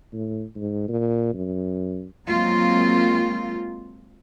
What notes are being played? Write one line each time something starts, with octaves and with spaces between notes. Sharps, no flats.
A2
G#2
A#2
F#2
F#3 G#3 A#3 C4 F4